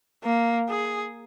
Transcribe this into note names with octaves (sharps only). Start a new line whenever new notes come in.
A#3
G#4